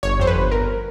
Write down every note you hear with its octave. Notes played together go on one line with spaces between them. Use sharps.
G1 C#5
F2 C5
B4
G1
G1 A#4